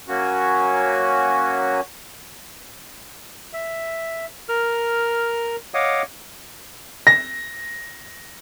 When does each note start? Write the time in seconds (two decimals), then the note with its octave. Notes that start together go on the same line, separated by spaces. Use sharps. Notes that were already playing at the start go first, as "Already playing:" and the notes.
0.08 F#3 A#3 C#4 F#4
3.53 E5
4.49 A#4 F6
5.74 C#5 D#5 F5 F#5 D6 D#6
7.07 A#6